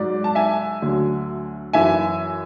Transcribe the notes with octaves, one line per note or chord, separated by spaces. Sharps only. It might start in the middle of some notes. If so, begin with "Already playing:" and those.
Already playing: G#2 F#3 D5
A5
E5 G#5
D2 D3 F#3
F#2 E3 E5 G#5